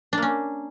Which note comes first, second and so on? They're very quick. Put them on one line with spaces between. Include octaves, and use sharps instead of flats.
D4 A#3 C#4